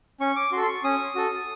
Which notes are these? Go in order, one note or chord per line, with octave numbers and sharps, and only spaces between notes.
C#4 C#6
D6
F#4 A4 C6
C6
C#6
C#4 D#6
F#4 A4